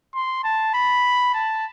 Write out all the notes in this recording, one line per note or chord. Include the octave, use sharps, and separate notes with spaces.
C6
A5
B5
A5